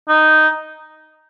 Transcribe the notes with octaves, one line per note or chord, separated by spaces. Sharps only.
D#4